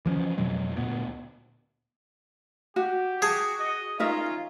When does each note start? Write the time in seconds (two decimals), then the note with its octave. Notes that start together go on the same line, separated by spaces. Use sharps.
0.06 E3 F3 C#4
0.38 F2 B2 F#3 G#3
0.76 D2 A#2 B3
2.76 F#4 G4
3.22 F#4 G#4 A5
3.60 D#5
4.00 C#4 D#4 F4 A#4 E5